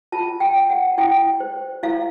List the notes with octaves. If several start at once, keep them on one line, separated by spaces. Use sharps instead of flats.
F4 A5
G5
C#5
F#5
E4 G5
C5
E4 F5